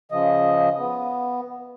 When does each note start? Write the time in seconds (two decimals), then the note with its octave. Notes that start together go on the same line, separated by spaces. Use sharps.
0.12 C#3 F3 D#5
0.79 B3